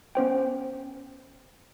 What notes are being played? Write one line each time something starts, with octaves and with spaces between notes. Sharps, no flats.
B3 C#4 C5 G5